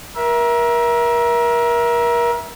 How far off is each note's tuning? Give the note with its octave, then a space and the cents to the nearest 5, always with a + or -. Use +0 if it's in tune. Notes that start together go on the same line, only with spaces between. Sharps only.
A#4 +30 E5 +0